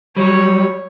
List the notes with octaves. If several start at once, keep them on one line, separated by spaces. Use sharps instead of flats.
F#3 G3 C#5